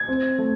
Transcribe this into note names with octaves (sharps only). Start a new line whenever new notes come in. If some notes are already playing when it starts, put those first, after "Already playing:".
Already playing: G#6
C4
A3